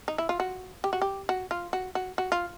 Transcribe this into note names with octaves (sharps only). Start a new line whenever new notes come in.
D#4
E4
F4
F#4
G4
F#4
G4
F#4
F4
F#4
F#4
F#4
F4